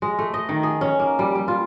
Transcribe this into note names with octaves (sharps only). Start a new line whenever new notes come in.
G#3
A3
D#5
D#3
G#4
C#4
A#3
G3
G3
F4